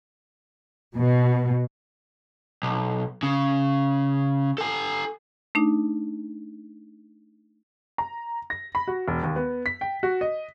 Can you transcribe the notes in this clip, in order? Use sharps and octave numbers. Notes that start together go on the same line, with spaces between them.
B2
B1
C#3
A4 G#5
A3 D4 D#4
A#5
A#6
B5
F#4
E1
D#2
B3
B6
G5
F#4
D#5